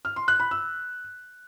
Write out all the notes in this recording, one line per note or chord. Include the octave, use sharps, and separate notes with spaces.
F6
C6
F#6
B5
E6